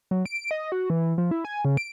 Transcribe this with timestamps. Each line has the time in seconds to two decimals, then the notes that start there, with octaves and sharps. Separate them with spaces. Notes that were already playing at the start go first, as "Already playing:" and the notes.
0.11 F#3
0.26 D7
0.51 D#5
0.72 F#4
0.90 E3
1.18 F3
1.31 E4
1.45 G#5
1.65 C#3
1.77 D7